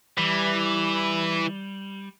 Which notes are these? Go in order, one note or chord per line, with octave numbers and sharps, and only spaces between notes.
E3 G3